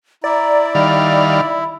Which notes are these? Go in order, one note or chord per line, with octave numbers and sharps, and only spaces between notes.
E4 D5 A#5
D#3 G3 F5 B5